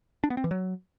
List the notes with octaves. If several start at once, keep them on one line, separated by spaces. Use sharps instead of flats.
D4
B3
C4
E3
F#3